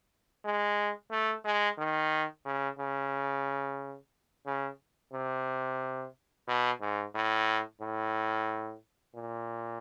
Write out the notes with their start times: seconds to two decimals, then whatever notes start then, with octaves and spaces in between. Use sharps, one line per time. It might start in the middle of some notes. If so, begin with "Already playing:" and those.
0.45 G#3
1.11 A3
1.45 G#3
1.78 D#3
2.45 C#3
2.79 C#3
4.46 C#3
5.13 C3
6.48 B2
6.81 G#2
7.15 A2
7.81 A2
9.15 A#2